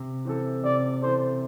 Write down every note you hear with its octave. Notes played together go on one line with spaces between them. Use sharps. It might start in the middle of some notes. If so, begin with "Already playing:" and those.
Already playing: C3
E3 C4 A4
C3 D5
E3 C4 A4 C5